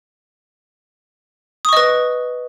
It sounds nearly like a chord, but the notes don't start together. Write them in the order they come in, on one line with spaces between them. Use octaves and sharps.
D#6 C#6 D#5 B4